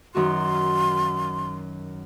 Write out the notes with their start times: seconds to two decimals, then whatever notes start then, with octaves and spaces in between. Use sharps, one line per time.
0.15 F#2 D#3 F#4 C6